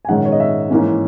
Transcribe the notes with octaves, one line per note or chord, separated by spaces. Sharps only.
G#5
A#1 G#2 D#3 G#3 C#4 F#5
C#5
D#5
E5
G#2 E3 A#3 C#4